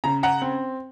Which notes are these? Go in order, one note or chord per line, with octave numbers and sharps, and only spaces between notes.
C#3 A#5
F#5 A#5
C4